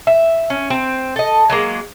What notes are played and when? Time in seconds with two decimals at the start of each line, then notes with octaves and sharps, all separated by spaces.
0.07 E5
0.50 C#4
0.70 C4
1.16 A4 D#5
1.50 F#3 G#3 A#3